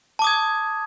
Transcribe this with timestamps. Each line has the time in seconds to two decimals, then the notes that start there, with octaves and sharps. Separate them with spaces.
0.19 A5
0.22 D6
0.24 D#6
0.27 G#6